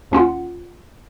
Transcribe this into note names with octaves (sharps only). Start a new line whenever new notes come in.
D#2 C#4 F4 F#5